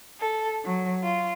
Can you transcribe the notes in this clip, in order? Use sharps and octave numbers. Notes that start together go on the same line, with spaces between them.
A4
F#3
F4